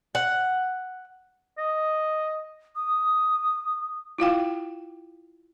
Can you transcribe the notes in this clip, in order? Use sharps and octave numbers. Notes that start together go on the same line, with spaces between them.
F#5
D#5
D#6
E4 F4 F5 G5